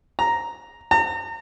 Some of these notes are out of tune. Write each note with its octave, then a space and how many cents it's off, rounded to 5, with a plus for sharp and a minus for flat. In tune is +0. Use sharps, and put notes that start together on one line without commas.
A#5 +0
A#5 -40